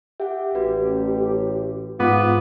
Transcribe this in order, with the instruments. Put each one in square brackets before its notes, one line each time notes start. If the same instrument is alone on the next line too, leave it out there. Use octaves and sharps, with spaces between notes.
[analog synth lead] G4 [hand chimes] E5 F#5
[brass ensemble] A1 [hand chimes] F#4 B4
[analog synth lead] G#2 [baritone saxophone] B3 [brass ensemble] F4 [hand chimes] D6